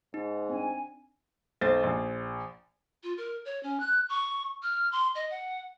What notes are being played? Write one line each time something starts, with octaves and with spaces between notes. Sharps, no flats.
G#2 D#4
C4 D4 G#5
B1 C5 A6
A#1
F4
A#4
C#5
C#4
F#6
C#6
F6
C6
D#5
F#5